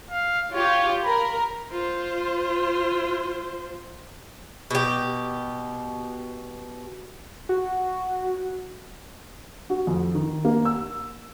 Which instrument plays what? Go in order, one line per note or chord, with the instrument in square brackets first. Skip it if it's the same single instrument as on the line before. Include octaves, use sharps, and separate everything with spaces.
[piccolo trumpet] F5
[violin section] F4 G4 [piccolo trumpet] C#5
[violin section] A#4 [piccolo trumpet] B5
[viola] F4 C5
[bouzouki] B2 G4
[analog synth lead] F#4
[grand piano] F#4
F2
D#3
A#3
E6